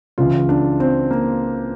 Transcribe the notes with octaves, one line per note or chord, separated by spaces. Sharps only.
C#2 C#3 E3 F4
D4
C4
A#3